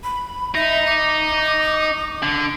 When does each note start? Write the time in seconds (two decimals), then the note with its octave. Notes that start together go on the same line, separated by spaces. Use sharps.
0.04 B5
0.55 D#4 E5
0.87 D6
2.23 D3